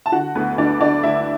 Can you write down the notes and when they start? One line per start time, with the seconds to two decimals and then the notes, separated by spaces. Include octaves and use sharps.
0.06 A5
0.12 D3 F#4 F#5
0.35 D2 B3 B4
0.58 D2 D4 D5
0.80 D2 D4 D5
1.03 D2 E4 E5